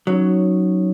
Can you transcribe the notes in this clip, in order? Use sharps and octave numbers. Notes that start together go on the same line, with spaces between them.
F#3 C#4 D#4 C#5